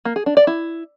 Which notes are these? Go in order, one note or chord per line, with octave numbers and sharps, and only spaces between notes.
A#3
G#4
D4
D5
E4